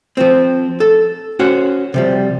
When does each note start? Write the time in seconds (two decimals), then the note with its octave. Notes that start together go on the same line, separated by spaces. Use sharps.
0.17 F3 C4
0.80 A4
1.39 C#4 F#4 C5 F#5
1.94 C3 F3 G3